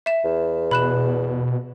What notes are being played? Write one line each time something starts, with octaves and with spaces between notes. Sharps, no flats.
E5 E7
E2
B2 B5 F#6 E7